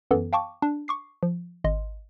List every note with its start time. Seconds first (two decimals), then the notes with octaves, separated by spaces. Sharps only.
0.11 F#2 E3 B3 A4
0.33 F5 G5 A5 C#6 D6
0.62 D4
0.88 C#6 D6 C7
1.23 F3
1.64 G#1 D#5 C6